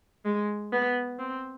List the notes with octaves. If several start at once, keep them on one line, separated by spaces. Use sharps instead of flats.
G#3
B3
C4